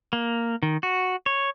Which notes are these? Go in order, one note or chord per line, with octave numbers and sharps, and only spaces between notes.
A#3
D#3
F#4
C#5